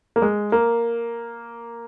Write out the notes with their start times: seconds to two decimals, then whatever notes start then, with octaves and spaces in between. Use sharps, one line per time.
0.16 A#3
0.22 G#3
0.52 A#3